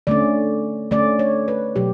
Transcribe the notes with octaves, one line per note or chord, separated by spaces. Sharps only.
D3 A3 C#4 D5
D3 A3 C#4 D5
C#5
B4
B2 F#3 G4